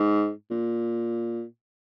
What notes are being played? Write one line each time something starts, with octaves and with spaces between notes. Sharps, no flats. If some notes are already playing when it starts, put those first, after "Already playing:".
Already playing: G#2
A#2